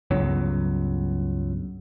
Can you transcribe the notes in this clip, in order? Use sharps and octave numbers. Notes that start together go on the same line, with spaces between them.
C#2 G2 F#3 B3